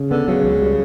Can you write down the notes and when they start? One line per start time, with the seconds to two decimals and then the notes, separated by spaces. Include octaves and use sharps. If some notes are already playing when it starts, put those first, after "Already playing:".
Already playing: C#3
0.11 D3 B3
0.28 C#3 F#3
0.44 C#2
0.61 G3